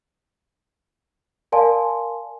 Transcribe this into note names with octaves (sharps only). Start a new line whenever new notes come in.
A#4 D5 F5 G#5 A5 C6